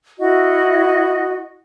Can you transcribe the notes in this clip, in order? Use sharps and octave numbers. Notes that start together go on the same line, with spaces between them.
E4 F#4 D#5